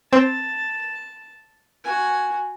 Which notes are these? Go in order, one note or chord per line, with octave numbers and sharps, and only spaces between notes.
C4 A5
F#4 G#5